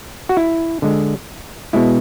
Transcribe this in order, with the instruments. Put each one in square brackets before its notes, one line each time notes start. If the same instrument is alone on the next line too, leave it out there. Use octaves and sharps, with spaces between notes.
[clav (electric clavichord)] F#4
E4
D3 G#3
B2 G#3 E4